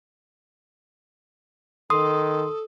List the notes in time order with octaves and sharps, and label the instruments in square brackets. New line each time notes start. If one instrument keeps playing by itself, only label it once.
[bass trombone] D#3 [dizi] A4 [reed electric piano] C6 [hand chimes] D#6